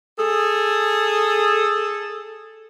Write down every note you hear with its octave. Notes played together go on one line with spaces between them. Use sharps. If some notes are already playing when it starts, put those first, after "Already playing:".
G#4 A4